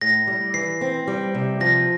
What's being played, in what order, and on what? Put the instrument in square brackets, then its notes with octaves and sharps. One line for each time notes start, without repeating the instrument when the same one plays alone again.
[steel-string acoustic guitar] A2 [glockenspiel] A#6
[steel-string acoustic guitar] G3
[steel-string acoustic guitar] E3 [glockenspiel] C7
[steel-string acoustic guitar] C4
G3
C3
[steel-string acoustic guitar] F3 [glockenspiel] A#6